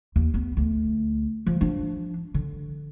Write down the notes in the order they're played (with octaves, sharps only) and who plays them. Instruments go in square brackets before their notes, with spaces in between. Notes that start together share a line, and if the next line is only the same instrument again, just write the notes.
[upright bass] D#2
B3
D2
F3
F3 D4
D3